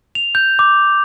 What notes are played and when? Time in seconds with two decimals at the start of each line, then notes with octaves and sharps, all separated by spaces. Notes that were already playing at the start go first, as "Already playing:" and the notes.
0.15 F7
0.35 G6
0.59 D6